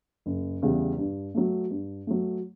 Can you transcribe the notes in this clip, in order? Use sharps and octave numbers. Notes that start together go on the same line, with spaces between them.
F#1
E2 C#3 E3 G3
G2
F#3 A3
G2
F#3 A3